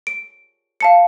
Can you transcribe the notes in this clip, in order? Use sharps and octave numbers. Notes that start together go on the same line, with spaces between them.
D7
F5 A5 C#7